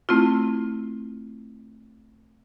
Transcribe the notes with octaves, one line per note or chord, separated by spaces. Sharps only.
A3 C4 E4 F4